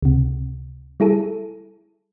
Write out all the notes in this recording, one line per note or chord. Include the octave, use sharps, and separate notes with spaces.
C#2 C3
G3 E4 G#4 A4